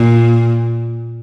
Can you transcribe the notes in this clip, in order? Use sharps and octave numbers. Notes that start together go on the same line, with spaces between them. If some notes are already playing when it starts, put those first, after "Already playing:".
Already playing: A#2